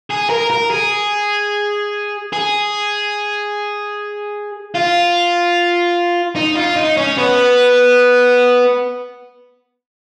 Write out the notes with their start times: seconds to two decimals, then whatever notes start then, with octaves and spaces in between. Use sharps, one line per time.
0.10 G#4
0.29 A#4
0.51 A#4
0.71 G#4
2.33 G#4
4.75 F4
6.36 D#4
6.56 F4
6.76 D#4
6.97 C#4
7.17 B3